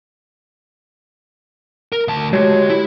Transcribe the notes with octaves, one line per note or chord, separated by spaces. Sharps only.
A#4
D2 A5
G#3 F#4 G4 C#5
E4